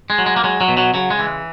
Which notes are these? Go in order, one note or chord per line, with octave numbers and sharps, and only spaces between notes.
G#3
F#3
G#3
A#3
F#3 G#3
F#3
B2
F#3
C#3 F#3
G#3
E3